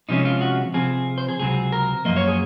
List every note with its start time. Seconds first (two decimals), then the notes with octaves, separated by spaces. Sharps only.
0.09 C3 F3 G#3 C#4 D#4
0.25 F4
0.41 F#4
0.74 C3 F3 C4 G#4
1.18 C5
1.29 G#4
1.40 C#2 C3 F#3 C4 G#4
1.72 A#4
2.05 F#2 F3 A#3 D#5
2.16 C#5
2.27 G#4